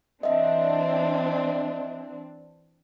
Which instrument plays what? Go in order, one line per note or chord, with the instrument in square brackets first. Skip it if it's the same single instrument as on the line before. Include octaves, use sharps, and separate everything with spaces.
[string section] E3 C4 D4 [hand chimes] D#5 E5